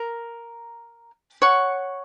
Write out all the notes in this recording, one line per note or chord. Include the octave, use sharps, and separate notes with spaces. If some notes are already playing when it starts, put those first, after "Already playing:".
Already playing: A#4 A#5
C#5 F#5 C#6